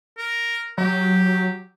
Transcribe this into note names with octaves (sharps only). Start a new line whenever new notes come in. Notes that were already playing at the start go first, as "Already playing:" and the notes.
A#4
F#3 G4